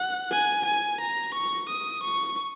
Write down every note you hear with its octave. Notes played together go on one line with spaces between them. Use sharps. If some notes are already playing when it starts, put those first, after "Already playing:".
Already playing: F#5
G#5
G#5
A#5
C#6
D#6
C#6